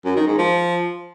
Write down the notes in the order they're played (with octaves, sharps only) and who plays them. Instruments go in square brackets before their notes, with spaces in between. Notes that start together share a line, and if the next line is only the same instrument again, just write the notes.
[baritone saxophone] F#2
D#3
G#2
F3